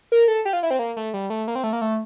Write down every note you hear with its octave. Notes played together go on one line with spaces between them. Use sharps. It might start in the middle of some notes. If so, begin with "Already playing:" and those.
A#4
A4
G4
F4
E4
C4
A#3
A3
G3
A3
A#3
C4
A3
A#3
A3